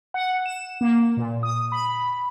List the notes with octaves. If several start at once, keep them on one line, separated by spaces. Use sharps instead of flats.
F#5
E7
A#3
A#2
D#6
B5